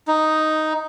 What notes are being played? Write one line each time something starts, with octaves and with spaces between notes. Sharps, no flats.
D#4